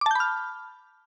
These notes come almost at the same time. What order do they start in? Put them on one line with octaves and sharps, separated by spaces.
D6 A5 G6 B5 F6